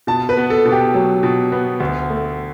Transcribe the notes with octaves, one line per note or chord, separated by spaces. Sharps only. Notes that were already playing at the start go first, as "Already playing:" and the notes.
B2 A5
B4
B3
A4
B2
G4
F#3
B2
B3
D2
A3